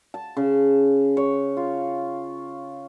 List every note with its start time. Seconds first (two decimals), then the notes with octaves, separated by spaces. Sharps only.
0.14 A5
0.37 C#3
1.17 C#5
1.57 F4